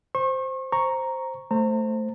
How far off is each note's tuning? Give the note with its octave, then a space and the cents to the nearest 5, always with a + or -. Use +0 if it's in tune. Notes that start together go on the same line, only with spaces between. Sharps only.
C5 -5 C#6 -40
C5 +0 A#5 +0 C#6 +0
A3 +0 C5 +0 A#5 -35